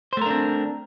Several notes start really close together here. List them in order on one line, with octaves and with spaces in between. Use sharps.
C5 A3 A#4 D4 C4